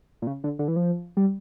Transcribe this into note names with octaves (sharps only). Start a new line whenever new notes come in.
A#2
C#3
D3
D3
E3
F3
G3